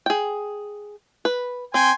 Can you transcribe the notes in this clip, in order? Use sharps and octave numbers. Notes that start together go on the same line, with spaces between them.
G#4 G5
B4
C4 G5 G#5 C6